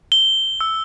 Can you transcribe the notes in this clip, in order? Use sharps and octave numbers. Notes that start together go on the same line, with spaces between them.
G7
E6